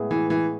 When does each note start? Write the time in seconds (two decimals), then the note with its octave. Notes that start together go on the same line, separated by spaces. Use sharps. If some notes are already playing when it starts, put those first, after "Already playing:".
Already playing: A2 G#3 B3 E4 G#4
0.11 E3
0.30 E3